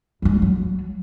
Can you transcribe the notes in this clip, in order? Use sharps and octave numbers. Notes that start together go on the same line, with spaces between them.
D1 G#3
F#3